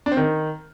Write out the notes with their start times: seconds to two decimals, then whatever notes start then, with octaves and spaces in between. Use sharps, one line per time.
0.06 D4
0.12 C4
0.17 D#3